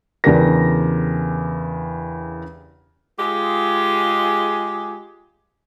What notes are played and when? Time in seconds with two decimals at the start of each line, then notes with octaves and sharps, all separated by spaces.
0.24 E2 C#3 D4 G4 A#4 A#6
3.19 G#3 F4 G4 G#4